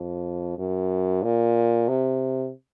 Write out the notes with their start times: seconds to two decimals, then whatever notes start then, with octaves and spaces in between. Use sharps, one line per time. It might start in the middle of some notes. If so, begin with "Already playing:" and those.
Already playing: F2
0.58 F#2
1.24 A#2
1.89 C3